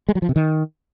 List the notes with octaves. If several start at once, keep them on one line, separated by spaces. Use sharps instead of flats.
G#3
F#3
F3
C3
D#3